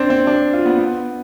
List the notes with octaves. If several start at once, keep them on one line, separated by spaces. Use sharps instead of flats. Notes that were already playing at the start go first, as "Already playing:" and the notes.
Already playing: C4 D4
C4
D4
F4
B3
B3